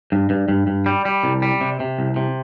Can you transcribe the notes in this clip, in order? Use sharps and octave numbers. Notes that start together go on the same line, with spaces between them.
G2
G2
G2
G2
G3
G3
C2
G3
C3
C3
C2
C3